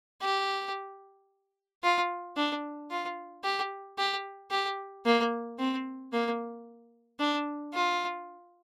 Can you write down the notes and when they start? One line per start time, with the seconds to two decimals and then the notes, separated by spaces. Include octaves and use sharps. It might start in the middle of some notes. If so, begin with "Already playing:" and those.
0.21 G4
1.83 F4
2.37 D4
2.90 F4
3.44 G4
3.98 G4
4.51 G4
5.06 A#3
5.59 C4
6.13 A#3
7.19 D4
7.73 F4